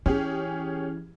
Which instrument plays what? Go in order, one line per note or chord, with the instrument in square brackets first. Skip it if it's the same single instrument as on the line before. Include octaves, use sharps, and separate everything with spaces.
[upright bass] E3 [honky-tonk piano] C#4 G4 G#4